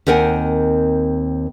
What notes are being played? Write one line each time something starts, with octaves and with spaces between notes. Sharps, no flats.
D#2 C4 A#4 F#5 G#5